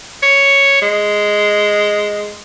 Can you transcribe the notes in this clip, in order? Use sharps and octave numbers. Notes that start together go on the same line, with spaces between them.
C#5
G#3